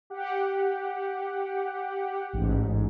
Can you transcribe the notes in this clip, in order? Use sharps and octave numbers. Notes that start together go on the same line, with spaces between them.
G4 F#5
A1 G#2